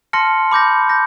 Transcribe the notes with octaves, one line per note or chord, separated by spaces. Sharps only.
A5 C6 F6 A#6 C#7
B5 D6 G6 A#6
G6 A#6